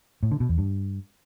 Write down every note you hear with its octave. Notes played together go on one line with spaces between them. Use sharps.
A2
D3
B2
E2
G2